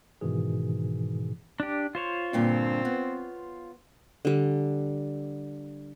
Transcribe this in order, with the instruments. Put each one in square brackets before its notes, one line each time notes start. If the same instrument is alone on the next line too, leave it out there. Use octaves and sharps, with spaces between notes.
[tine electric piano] G#2 B2 D#3 E3 G#4
[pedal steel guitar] D4 G4
F4 C5 C#5
[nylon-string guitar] G2 A#2 D3 [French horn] C4
[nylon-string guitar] B3
[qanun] D3 G3